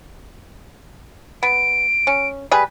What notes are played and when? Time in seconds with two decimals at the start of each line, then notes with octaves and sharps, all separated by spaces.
1.43 B3 D7
2.07 C#4
2.51 G3 G#4 B4